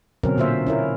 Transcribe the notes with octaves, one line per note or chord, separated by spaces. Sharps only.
B2 D3 F#3 C4 C#4 A#4
A#2 D3 A#3 F4 C5 E5
C#4 E4 A#4